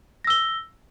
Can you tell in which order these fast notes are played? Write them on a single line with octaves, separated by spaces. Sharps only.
A#6 E6 G7